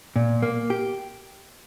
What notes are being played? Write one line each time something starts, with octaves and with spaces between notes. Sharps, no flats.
A#2
A#3
G4